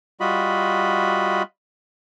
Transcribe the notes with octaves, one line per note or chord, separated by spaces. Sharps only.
G3 F4 F#4 D#5 B5